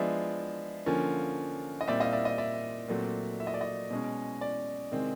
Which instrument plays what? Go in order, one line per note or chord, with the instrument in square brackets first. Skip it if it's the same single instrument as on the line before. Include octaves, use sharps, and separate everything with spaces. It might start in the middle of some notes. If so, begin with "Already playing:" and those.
Already playing: [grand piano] F3 G#3 B3 D4 D5 E5
D3 F3 A#3 C#4
D#5
A#2 G3 C4 D5 E5
D#5 F5
D5 E5
D#5
D5 E5
A#2 F#3 A3 C4
E5
D#5
D5
D#5
B2 G#3 C#4
D5
C3 D#3 G#3 C4